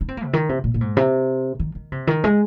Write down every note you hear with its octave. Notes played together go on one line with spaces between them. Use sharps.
D#4
C4
A#3
C3
D#3
C3
A#2
A#2
G#2
C3
D#3
D#3
C3
D#3
G#3